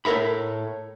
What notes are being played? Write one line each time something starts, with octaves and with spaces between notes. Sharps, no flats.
A2 A4 A#4 E5 B5